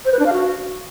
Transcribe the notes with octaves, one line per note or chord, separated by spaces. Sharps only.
C5
B4
D4
F5
F#4